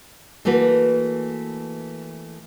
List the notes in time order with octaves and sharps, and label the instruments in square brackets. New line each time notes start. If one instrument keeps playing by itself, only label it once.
[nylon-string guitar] E3 A3 A#3 F#4 B4